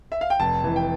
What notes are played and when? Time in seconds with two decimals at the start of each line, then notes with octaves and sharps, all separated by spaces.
0.12 E5
0.21 F5
0.30 G5
0.40 F1 A5
0.64 E3
0.76 G5